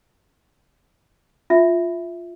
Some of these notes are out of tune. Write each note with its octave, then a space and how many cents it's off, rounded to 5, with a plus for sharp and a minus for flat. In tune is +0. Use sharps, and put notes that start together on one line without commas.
F4 +0 E5 +0